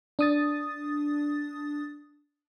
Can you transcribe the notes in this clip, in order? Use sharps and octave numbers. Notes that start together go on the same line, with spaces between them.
D4 D#6 A6